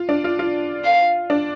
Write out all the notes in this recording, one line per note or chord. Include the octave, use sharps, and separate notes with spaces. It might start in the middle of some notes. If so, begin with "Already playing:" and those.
Already playing: F4
D4
F4
F4
F5
D4